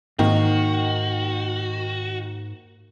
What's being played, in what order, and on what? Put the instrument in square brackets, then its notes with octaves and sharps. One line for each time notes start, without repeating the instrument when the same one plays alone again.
[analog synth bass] G#2 [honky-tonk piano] D#3 [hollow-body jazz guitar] A#3 D#4 [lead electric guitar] F#4